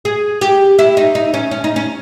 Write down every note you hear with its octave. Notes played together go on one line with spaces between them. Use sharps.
G#4
G4
E4
D#4
D#4
C#4
C#4
D#4
C#4